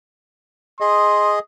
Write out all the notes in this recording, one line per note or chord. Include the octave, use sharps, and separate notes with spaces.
G#4 D#5 C6